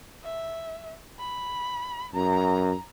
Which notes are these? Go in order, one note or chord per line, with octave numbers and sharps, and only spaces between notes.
E5
B5
F#2 A#5